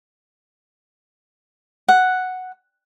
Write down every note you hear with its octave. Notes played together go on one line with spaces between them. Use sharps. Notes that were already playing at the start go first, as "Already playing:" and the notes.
F#5